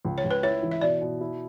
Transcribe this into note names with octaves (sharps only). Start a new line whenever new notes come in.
C#2
C#5
C#2
B4
E4 C#5
E3
E5
B2 D5
B2
E4